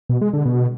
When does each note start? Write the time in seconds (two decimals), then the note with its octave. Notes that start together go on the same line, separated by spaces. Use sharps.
0.09 B2
0.21 G#3
0.33 D3
0.45 B2